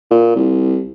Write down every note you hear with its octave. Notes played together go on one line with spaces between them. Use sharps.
A#2
C2